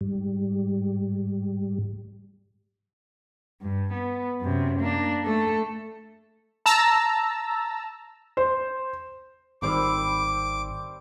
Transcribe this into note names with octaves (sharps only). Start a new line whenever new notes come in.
G#2 G3
G2
B3
F#2 C3
A#3 D4
A3 A4
A5 A#5 E6
C5
G#1 D#3 G3 C4 C6 D6